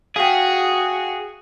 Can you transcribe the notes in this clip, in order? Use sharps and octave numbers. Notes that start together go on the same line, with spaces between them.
F#4 G#4 F5 G5